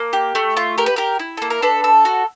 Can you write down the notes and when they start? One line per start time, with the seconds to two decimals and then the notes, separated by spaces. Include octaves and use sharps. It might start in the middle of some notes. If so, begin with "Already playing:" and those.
Already playing: A#3
0.13 G4
0.35 A3
0.57 F4
0.78 G4 A#4
0.86 B4
0.96 G4 A#4
1.19 E4
1.37 A#3 A4
1.50 A#4
1.62 D4 A4 B4
1.84 A4
2.05 F#4